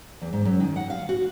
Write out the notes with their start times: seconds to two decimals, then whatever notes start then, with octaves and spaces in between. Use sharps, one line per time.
0.22 E2
0.33 G#2
0.45 F#2
0.60 D#3
0.76 F#5
0.90 F5
1.09 F#4